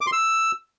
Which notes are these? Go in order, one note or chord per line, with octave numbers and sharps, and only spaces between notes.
D6
C6
E6